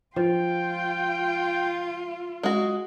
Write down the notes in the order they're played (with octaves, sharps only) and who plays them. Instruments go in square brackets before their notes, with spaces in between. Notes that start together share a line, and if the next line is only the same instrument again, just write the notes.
[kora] F3 [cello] F4 [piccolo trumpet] G5
[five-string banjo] G#3 F#4